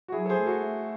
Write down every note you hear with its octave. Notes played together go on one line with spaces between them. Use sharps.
F#4
F#3 E4 G#4
A4
G#4 C5
A3
F#4 A4
A3